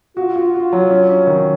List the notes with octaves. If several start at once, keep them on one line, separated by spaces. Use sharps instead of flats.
F4 F#4
F#4
F#4
F#3
C#4
C#4
D#3